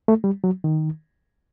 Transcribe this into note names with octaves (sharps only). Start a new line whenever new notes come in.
A3
G3
F#3
D#3